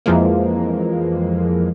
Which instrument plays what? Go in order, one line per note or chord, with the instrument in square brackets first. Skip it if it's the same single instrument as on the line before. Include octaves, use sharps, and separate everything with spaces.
[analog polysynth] F2 E3 F3 G#3 A#3